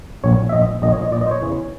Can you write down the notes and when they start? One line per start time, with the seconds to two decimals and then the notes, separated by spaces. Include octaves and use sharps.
0.24 A#1 A#2 C#5
0.49 E5
0.52 A#1 A#2 D#5
0.82 A#1 A#2 D#5
0.92 C#5
1.02 D#5
1.12 A#2 D5
1.15 A#1
1.21 D#5
1.27 C5
1.31 C#5
1.41 E2 C#3 E3